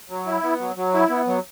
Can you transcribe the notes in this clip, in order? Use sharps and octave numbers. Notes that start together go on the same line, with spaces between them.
F#3
E4
B3
F#3
F#3
E4
B3
F#3